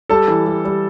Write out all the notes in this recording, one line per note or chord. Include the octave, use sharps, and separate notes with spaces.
G3 A4 A5
E3
G3
G3